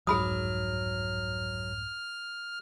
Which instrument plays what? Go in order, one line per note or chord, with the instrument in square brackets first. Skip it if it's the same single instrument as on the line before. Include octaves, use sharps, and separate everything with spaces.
[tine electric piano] C2 F2 G#2 [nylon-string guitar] F#3 [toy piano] G#4 B5 D#6 [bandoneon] F6